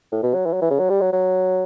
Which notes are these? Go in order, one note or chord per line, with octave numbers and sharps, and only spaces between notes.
A2
B2
F#3
E3
F#3
E3
C#3
F#3
G3
F#3
F#3